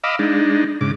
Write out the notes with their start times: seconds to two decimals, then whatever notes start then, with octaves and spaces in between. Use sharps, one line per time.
0.04 D#5 F5 B5 D6 E6
0.19 G#3 D4 D#4
0.81 G#2 C#3 D6